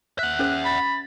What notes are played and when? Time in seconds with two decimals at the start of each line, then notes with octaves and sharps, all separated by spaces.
0.19 E5 F#5 F#6
0.39 C#4 G#4 C5
0.66 B5 A6